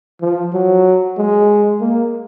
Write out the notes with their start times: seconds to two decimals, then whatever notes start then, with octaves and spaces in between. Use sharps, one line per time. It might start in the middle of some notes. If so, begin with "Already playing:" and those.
0.21 F3
0.53 F#3
1.17 G#3
1.81 A#3